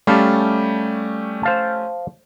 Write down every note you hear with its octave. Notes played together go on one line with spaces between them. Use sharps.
G3 A3 C#4 G4 F5 A5
C5 F5 A5